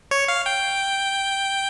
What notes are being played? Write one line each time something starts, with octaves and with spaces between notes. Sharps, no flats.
C#5
F5
G5